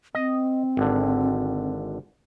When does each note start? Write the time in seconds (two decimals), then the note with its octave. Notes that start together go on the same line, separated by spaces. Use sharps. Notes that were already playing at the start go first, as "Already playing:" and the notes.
0.15 C4 D#5
0.77 G#1 D3